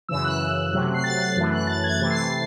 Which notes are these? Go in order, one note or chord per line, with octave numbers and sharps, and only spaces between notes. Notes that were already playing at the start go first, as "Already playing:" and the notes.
F#2 C#3 E3 E6
F#6
C3 F#3 A3
C7
A6
C7
F#2 E3 A3
F#6
A6
G#6
C3 E3 A3 A6
C7
A6